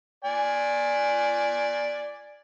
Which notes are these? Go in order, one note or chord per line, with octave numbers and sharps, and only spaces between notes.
D5 G#5